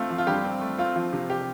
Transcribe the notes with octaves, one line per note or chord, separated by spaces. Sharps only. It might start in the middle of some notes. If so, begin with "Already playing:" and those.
Already playing: A3 C4 F4
F3
F4
G2 G4
C4
A3
C4 F4
F3
C3
G4